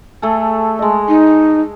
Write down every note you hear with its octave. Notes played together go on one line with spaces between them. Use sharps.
A3 G#4 A4
G#3 D#5
D#4